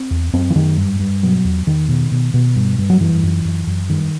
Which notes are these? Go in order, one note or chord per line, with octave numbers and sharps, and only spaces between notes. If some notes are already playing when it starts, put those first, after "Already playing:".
Already playing: C4
E2
F#2 C4
E3
F#2 D#3
G2
G2
B2 F#3
E2
E2 D#3
B2
B2
B2
G2
G2
F#3
F#2 E3
F#2
F#2
F#2
G2 D#3